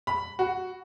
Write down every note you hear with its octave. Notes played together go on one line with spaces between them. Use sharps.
B5
F#4